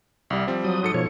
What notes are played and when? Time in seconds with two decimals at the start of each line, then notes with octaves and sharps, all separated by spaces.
0.30 C2 G3
0.47 F3 G3 C4
0.64 F#3 D#6
0.83 G#2 A4 C#7
0.94 B2 F3 C#5